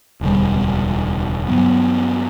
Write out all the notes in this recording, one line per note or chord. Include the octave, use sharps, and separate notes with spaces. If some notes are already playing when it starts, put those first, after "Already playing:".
E1 D2 C#3 G3
G2 F#3 B3